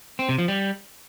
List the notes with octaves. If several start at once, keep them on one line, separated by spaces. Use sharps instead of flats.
C4
C3
F3
G3